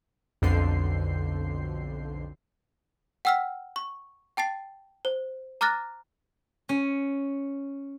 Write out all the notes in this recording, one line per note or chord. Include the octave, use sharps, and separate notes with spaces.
B1 F2 D3 C6 G6 C7
F#5 G5 E6 F6 B6
C#6
G5 A5 A6 C7
C5
A#5 D6 F6 F#6 A6 A#6
C#4